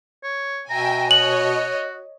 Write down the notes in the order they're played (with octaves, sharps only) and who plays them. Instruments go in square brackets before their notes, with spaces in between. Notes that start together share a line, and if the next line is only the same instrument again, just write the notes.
[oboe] C#5
[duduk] B2 [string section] E5 G5 G#5 [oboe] A#5
[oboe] F#4 [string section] C#5 D#5 [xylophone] F#7